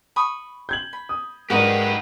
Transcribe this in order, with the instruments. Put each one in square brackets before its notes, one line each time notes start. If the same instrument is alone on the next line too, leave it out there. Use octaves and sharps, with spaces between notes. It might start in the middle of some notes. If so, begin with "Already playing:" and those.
[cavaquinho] B5 C#6 D#6
[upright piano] G6 G#6 F#7
[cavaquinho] B5
[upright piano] D#6
[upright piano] G#2 D5 [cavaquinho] D#4 F#4 F#5 [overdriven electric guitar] G4 B4 [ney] A#4